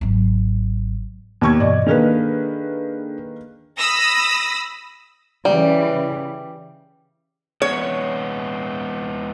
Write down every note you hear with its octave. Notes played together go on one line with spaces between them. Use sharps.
G#1 F#3
D#2 B3 C#6 G#6
G2 B2 E3 D5 D#5
D#3 A#3 D4 G#4 A4 B4
B5 D#6 E6 A#6
C#3 E3 G3
G#3 B3 C#5